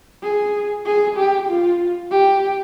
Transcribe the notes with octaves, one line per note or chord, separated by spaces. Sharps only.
G#4
G#4
G4
F4
G4